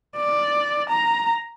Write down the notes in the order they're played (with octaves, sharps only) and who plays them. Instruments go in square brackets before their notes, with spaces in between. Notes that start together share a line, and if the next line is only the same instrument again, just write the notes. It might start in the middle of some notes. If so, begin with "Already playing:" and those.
[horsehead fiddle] D5
A#5